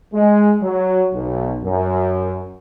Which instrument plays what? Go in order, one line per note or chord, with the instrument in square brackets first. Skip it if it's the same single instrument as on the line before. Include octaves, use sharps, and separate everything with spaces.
[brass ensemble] G#3
F#3
B1
F#2